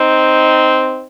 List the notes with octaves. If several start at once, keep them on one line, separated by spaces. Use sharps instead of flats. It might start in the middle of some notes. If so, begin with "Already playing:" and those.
Already playing: C4 D#4